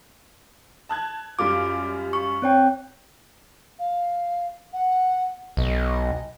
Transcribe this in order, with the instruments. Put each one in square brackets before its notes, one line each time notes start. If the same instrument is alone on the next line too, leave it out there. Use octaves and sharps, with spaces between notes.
[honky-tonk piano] A5 F#6 G#6
[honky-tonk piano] F#2 G3 F4 [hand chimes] D6
[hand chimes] C#6
C4 C#5 G5
[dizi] F5
F#5
[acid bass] B1 [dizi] D#5